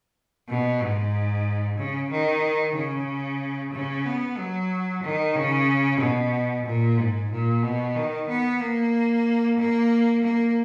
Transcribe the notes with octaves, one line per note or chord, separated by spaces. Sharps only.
B2
G#2
C#3
D#3
C#3
C#3
B3
F#3
D#3
C#3
B2
A#2
G#2
A#2
B2
D#3
B3
A#3
A#3
A#3